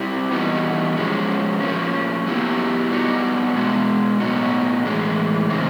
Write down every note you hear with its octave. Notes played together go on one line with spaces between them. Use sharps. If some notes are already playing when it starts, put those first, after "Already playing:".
Already playing: G3 C4 E4 G4
E3 G3 B3 D#4 F#4
F3 G#3 C#4 F#4
F3 A#3 C#4
F#3 B3 E4 G4
G3 B3 D#4 F#4
B2 G#3 B3
A2 F#3 B3 D#4 F#4
A2 E3 G#3
C#3 E3 C4 D#4